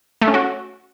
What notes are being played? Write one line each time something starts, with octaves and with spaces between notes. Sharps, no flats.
A3
C#4
F#4